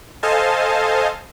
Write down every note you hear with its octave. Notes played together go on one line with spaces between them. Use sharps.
A4 C5 D#5 F5 G#5 A5